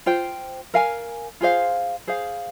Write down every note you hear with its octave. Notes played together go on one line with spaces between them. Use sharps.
F4 C5 G5
A#4 F5 G#5
F4 G#4 C5 F5
G#4 C5 F5